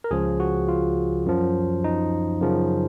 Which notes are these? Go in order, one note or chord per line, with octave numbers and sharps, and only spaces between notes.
A#4
C#2 C#3 F3 G#4
F#4
F4
F#2 F3
D#4
F#2 C#3 F3